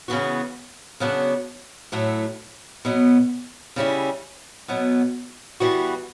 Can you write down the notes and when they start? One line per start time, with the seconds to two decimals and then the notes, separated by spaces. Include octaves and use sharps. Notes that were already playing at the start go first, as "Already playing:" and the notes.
0.08 C#3 E3 B3 F#4
1.00 C#3 F#3 B3 D4 F#4
1.92 A2 F#3 A3 E4
2.85 B2 F#3 B3
3.76 C#3 G3 C#4 E4
4.68 B2 F#3 B3
5.60 E3 G3 B3 F#4